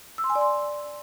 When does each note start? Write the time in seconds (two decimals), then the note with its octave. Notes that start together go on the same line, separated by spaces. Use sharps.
0.18 E6
0.24 C6
0.30 G#5
0.35 D5
0.41 C6